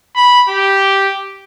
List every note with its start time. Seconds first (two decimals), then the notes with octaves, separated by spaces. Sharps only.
0.16 B5
0.49 G4